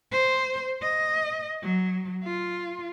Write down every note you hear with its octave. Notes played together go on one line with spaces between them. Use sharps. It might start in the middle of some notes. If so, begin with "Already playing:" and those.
C5
D#5
F#3
F4